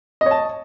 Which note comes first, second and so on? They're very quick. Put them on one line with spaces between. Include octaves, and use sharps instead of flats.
D#5 C#5 A5